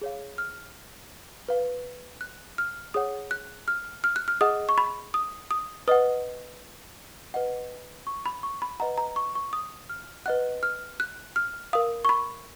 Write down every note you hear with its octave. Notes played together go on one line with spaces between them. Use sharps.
G#4 C#5 F5
F6
B4 F5
F#6
F6
G#4 C#5 F#5 D#6
F#6
F6
F6
F#6
F6
G#4 D#5 F#5 D#6
C#6
B5
D#6
D#6
B4 D#5 F#5 D#6
B4 D#5 F#5
C#6
B5
C#6
B5
B4 D#5 F#5 A#5
A#5
C#6
C#6
D#6
F6
B4 D#5 F#5 F#6
F6
F#6
F6
A#4 F5 D#6
C#6
B5